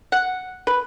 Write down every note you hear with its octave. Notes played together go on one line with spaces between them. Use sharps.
F#5
B4